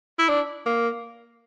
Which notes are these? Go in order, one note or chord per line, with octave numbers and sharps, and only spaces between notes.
E4
D4
A#3